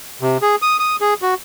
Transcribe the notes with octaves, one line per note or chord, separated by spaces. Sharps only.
C3
G#4
D#6
D#6
G#4
F#4